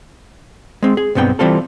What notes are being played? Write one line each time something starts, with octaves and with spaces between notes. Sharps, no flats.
G#3 C4
G#4
B1 G2 B3 C4 G5
E3 G3 C4 F4 A4